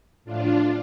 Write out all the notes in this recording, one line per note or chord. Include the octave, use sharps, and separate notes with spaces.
A2 F3 D4 F4